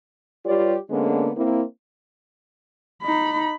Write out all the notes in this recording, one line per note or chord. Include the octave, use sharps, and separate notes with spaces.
G3 F4 G4 B4 C#5 D5
D3 G#3 A#3 B3 C#4 D4
A#3 C4 E4
D#4 B5